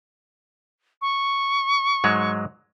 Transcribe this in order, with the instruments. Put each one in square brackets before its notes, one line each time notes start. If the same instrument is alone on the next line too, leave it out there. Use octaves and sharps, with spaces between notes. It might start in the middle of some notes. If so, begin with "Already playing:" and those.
[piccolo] C#6
[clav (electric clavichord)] G#2 F#3 G#3